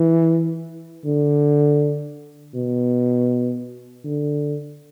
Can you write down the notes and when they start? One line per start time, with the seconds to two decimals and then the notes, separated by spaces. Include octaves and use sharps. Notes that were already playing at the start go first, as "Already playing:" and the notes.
Already playing: E3
1.05 D3
2.55 B2
4.04 D3